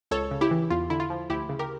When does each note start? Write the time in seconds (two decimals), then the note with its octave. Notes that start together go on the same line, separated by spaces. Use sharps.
0.11 C#2 A4 C#5
0.31 C#3
0.41 E4 G4
0.51 E3
0.70 E2 F4
0.90 D3 E4
1.00 F4
1.10 F3
1.30 D2 E4 G4
1.49 C#3
1.59 G4 A#4